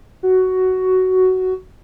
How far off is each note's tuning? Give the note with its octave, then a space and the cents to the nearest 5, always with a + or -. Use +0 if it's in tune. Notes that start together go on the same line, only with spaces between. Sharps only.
F#4 +10